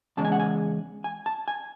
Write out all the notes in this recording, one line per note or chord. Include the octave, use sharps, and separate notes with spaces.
E2 C#3 G#3 A5
G#5
F#5
G#5
G#5
A5
G#5